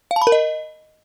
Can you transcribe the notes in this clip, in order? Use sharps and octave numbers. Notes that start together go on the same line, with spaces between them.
F5
A5
B5
A#4
D#5